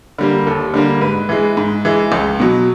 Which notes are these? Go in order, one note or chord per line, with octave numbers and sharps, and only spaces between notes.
D3 G3 A#3
D#2 A4
D3 G3 A#3
G#2 B4
E3 G#3
G#2
E3 G#3
C#2
B2 F#3